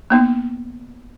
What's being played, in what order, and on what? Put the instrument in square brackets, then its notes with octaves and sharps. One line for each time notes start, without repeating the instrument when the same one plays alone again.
[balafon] A#3 B3 D#4